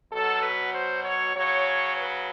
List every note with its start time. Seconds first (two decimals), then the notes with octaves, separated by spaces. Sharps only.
0.12 B2 F#3 A4
0.43 B4
0.74 C5
1.05 C#5
1.35 C#3 F#3 C#5
1.97 B4